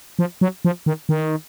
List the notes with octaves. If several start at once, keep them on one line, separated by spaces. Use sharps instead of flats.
F3
F#3
F3
D#3
D#3